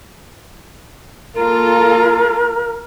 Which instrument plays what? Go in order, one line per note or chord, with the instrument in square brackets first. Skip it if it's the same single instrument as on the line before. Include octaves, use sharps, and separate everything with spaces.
[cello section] A#3 F4 A4 [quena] A#4